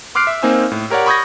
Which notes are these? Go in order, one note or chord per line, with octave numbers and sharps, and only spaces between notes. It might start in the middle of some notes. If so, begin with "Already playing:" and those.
C6 D6 F6 F#6 C7 D7
E5
A#3 C4 D#4 C5 G#5 E6
A2
G4 A#4 C#5 D5 F#5
B5 C#6 D#6 G6 G#6 A#6